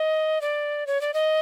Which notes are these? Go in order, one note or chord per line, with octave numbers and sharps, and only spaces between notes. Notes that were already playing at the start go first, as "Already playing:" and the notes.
Already playing: D#5
D5
C#5
D5
D#5